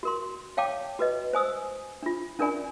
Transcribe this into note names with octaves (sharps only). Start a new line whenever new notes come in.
F#4 A#4 C6
C#5 F5 G5 A5 D6
F#4 B4 D#5
C5 G#5 D#6 E6
D4 F4
C#4 D4 A#4 D5 G#5 B5